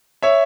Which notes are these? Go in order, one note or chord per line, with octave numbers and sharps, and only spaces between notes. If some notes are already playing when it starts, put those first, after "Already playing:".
C#5 E5